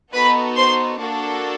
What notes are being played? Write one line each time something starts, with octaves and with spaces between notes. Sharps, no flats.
B3 D#4 F#4 A4 B4 B5
C5 C6
A#3 D4 F#4 A4